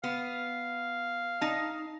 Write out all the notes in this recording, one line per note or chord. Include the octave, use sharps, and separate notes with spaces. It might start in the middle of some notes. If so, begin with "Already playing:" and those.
B3 F5
D#4 A5